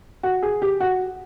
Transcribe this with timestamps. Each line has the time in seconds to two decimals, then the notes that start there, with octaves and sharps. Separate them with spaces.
0.23 F#4
0.42 G#4
0.62 G4
0.81 F#4